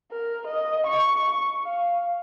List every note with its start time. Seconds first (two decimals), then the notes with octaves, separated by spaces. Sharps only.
0.11 A#4
0.47 D#5
0.87 C#6
1.64 F5